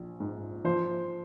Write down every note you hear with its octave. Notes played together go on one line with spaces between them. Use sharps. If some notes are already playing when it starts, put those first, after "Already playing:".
Already playing: A#1
G#2
F3 C5